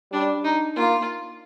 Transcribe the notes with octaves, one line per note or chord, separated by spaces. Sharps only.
G3 D4
D#4
A#3 F4